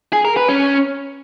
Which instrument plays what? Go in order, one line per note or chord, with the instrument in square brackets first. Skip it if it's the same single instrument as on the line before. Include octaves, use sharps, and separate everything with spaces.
[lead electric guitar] G#4
A#4
B4
C#4